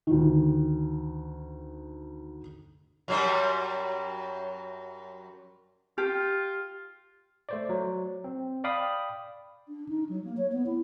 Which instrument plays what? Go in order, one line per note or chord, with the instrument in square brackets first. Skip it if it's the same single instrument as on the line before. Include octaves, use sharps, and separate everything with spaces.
[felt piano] D2 D#3
[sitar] F#2 F#3 G3
[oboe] F4 [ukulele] G4
[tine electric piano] A3 C5 D5
F#3
C4
D5 F5 G5 B5 D#6
[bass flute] D4
D#4
F#3
A#3
C#5
B3
E4